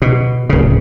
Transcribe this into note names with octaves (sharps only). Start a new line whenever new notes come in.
B2
D1 C#3